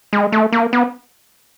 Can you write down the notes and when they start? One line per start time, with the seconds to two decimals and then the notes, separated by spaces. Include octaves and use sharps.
0.13 G#3
0.32 A3
0.52 A#3
0.73 B3